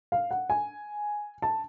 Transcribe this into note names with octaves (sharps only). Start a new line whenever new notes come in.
F5
F#5
G#5
A5